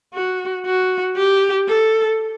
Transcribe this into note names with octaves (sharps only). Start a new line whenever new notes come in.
F#4
F#4
G4
A4